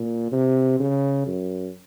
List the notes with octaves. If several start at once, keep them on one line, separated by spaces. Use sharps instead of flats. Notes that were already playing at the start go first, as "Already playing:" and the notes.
Already playing: A#2
C3
C#3
F#2